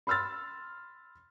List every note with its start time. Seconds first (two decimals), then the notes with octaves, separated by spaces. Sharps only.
0.07 B5 C6 E6 F6 A6